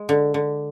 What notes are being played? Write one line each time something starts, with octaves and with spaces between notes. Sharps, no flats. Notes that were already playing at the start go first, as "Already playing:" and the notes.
Already playing: G#3
D3
D3